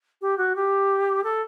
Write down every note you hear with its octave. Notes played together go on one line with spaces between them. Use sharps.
G4
F#4
G4
A4